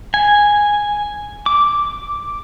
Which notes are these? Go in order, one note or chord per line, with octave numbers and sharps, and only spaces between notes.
G#5
D6